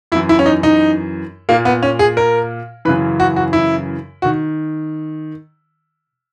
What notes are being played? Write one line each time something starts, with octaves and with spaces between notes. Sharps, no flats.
F#2 E3 E4
E4
C#4
D#4
D#4
A#2 A#3
B3
C#4
G#4
A#4
F#2 C#3 E3 B4
F#4
F#4
E4
F#4
D#3